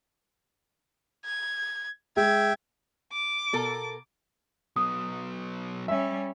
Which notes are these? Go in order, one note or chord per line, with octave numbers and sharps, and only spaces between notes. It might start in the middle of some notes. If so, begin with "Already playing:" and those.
G#6
G#3 E5 G5 G#6
D6
B2 A4 A#4
F#3 B3 D#6
G3 C#4 E5